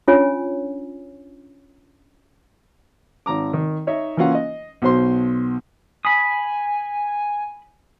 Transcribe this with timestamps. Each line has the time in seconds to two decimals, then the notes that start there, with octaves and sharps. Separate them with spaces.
0.08 C#4 D4 F4 C#5 G#5
3.26 G#1 A#5 D6
3.53 D#3
3.87 D#4 C#5 D#5 E5
4.17 E3 A#3 C#4 F4 F5 F#5
4.35 D#5
4.82 B1 B2 C5 C6
6.05 G#5 B5 D#6